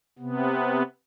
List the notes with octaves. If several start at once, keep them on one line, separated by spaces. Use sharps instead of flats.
C3 B3